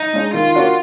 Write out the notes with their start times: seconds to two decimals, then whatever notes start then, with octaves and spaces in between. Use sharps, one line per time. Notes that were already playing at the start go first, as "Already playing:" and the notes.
Already playing: D#4
0.13 G#3 D4
0.34 D#3 F4
0.55 A#3 D4 F#4